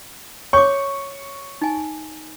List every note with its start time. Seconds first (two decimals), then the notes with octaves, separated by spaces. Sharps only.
0.53 C#5 C#6 D6
1.61 D#4 G#5